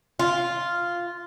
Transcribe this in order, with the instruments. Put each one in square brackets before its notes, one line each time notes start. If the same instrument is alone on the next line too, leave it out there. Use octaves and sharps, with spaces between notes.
[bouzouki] F4